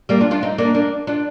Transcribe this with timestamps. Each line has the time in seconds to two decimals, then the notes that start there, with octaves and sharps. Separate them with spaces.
0.09 G3 A#3
0.21 D4 F4
0.31 D4 F4
0.43 C4 D#4
0.58 A#3 D4
0.75 A#3 D4
1.07 D4 F4